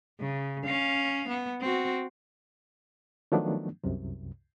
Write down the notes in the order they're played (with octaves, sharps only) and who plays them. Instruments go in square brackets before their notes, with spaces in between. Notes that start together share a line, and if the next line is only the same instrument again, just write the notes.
[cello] C#3
C#4 F5
B3
C4 F#4
[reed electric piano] D#3 F3 F#3 A3 B3 D4
C2 F#2 C3